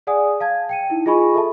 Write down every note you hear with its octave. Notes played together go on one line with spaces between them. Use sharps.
G#4 D5 F#5 G#5 D#6
F5 A5 G#6
G5 C#7 D#7
D#4 E4
F4 G#4 D#5 G#5 B5 C#6
A4 E5 A5